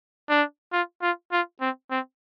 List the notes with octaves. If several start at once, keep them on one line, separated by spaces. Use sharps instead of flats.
D4
F4
F4
F4
C4
C4